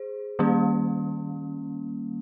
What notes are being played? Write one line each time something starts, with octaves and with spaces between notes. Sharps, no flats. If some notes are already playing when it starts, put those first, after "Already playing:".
Already playing: G#4 C5
D#3 G3 A#3 C#4